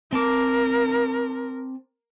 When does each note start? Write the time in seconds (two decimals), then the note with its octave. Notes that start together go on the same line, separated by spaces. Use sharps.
0.13 C4 A#4 A5 D6